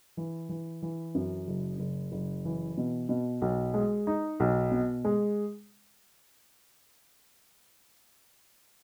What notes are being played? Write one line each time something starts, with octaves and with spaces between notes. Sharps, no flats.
E3
E3
E3
F#2
F#1
F#1
F#1
E3
B2
B2
B1
G#3
D#4
B1
B2
G#3